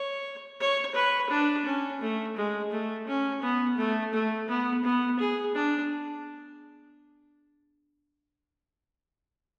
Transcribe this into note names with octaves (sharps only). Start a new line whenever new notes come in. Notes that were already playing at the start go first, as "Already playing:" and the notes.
Already playing: C#5
C#5
B4
D4
C#4
A3
G#3
A3
C#4
B3
A3
A3
B3
B3
G#4
D4